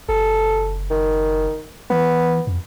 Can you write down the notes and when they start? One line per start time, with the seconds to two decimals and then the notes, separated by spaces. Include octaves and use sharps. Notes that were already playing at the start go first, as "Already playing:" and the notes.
0.09 F#1 A4
0.91 D#3
1.90 E3 B3
2.47 F2